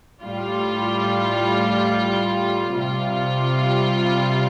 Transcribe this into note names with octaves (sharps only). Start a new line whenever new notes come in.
A2 G3 F4
C3 G3 F4